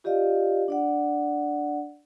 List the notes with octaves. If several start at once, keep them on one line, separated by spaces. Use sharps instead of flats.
F4 G4 D5 D#5 F5
D4 D5 F#5